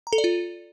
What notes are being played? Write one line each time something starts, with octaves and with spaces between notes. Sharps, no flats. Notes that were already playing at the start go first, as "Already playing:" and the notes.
A#5
A4
D5
F4